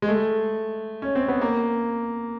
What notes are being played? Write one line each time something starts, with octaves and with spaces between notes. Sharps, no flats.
G#3
A3
C#4
C4
B3
A#3